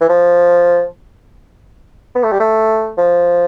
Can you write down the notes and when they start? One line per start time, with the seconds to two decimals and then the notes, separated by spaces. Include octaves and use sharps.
0.01 E3
0.09 F3
2.15 B3
2.23 A3
2.32 G3
2.40 A3
2.97 F3